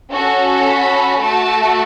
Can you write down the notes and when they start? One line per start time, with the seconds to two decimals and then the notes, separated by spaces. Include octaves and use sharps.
0.11 C#4 F#4 A4
0.66 B5
1.21 A3 F#4 A4 A5